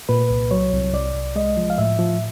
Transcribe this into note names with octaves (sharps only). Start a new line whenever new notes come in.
A#2 B4
C2
F#3 C#5
C2
C2 D5
C2
G#3 D#5
F3
F5
A2 E5
F3